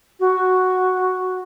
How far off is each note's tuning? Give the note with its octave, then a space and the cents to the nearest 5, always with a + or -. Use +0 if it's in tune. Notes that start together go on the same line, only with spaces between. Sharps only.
F#4 +0